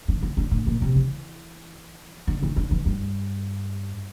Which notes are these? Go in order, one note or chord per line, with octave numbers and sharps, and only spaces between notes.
D3
E3
D3
A2
A#2
C3
E3
D3
E3
D3
E3
G2